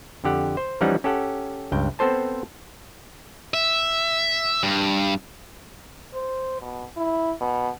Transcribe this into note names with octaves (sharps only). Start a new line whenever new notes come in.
F2 D3 G4 F#5
C5
E3 F3 G3 C#4 D#4 F#5
C#4 G4 A4 F#5
C#2 G2 G5
B3 C4 A4 C5 A5
E5
G2
C5
B2
E4
B2